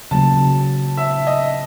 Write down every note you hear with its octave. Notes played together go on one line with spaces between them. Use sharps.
C#3 F#3 A#3 A5
E5
D#5